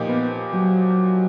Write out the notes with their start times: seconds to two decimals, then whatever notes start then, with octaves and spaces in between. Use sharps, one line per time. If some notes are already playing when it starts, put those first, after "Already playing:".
Already playing: A#2 F3 A#3 D#4 G4
0.08 B3
0.53 F#3